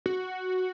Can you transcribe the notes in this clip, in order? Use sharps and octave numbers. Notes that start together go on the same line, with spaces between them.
F#4